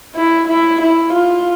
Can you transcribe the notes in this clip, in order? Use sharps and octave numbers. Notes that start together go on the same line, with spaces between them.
E4
E4
E4
F4